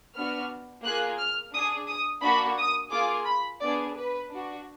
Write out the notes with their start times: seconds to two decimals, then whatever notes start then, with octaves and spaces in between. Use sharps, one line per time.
0.15 B3 D4 F#4 F6
0.84 A#3 F4 G#4 F#6
1.19 F6
1.53 D4 G#4 D#6
1.88 D#6
2.23 A#3 D4 F#4 B5
2.58 D#6
2.92 A#3 F4 G#4 D6
3.26 B5
3.61 B3 D4 G#4 D5
3.96 B4
4.30 D4 F#4